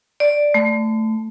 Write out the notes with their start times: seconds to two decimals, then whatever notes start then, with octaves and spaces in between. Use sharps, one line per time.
0.20 D5
0.54 A3